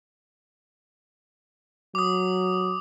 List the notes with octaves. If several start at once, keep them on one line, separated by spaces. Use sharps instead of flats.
F#3 D6 D#6